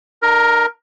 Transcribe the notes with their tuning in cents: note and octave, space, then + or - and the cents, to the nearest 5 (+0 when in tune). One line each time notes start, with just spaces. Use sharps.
D#4 -40 A#4 +10